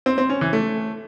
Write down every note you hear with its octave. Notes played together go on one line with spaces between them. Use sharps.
C4
C4
C#4
E3
A3